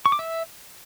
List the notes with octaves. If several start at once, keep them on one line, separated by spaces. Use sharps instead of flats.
C#6
D6
E5